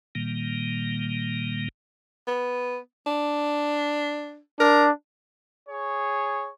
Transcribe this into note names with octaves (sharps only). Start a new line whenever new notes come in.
A#2 D#3 G3 A#3
B3
D4
D4 A#4
G#4 C#5